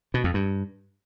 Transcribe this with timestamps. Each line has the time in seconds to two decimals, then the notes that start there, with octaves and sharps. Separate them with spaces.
0.14 B2
0.24 F2
0.34 G2